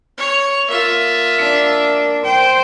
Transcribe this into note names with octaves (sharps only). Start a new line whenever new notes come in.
C#5
A#3 F4 E5
D4
C5 G5